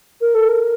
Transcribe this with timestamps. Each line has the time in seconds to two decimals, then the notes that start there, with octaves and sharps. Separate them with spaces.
0.21 A#4
0.34 A4
0.48 A#4